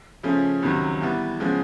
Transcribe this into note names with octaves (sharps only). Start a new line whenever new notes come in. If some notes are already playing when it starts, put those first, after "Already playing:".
C#3 F3 A3 C#4
C#2 C3 D#3 F#3
E3 G3 B3
C#3 F3 G#3 B3